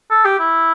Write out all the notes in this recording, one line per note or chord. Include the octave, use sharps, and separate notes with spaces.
A4
G4
E4